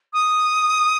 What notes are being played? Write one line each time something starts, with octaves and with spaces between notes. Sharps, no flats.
D#6